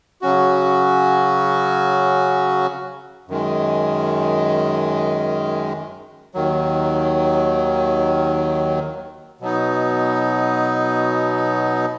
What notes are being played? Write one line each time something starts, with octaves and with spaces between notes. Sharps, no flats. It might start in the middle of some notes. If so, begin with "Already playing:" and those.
C#3 F#3 C#4 F#4
F#2 D#3 G#3
D#2 D#3 F#3
B2 F#3 B3 D#4